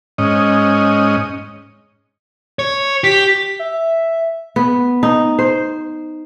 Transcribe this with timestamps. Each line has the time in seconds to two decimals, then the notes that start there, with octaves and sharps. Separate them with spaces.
0.18 G#2 C#4 D#5
2.59 C#5
3.04 G4 B6
3.59 E5
4.56 B3
5.03 D#4
5.39 C5